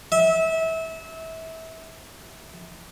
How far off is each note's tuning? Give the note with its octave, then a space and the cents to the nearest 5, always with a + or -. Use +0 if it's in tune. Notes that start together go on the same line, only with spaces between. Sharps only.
E5 -25